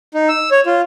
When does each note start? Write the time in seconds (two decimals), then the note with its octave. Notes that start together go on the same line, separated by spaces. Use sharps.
0.14 D#4
0.29 E6
0.51 C#5
0.66 F4